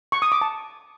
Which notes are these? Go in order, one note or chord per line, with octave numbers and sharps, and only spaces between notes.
C#6
D#6
D6
A5